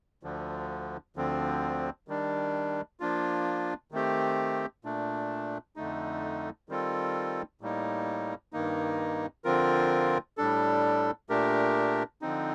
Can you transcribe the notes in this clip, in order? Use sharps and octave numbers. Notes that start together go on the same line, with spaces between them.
D2 D3 F3
D2 D3 F3 C4
D#3 G3 D4
F3 A#3 D4 F4
D#3 A3 C4 G4
A#2 A3 D4
F2 D3 A3 D#4
D#3 G3 C4 F4 A4
A2 G3 A#3 D#4
G2 D#3 A#3 D#4
D3 F3 C4 F4 A#4
A2 G3 D4 A4
A#2 A3 D4 G4 A#4
D3 F3 C4 D#4